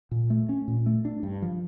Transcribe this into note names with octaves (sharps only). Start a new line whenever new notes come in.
A#2
A3
C#4
A#2
A3
D4
G2
F3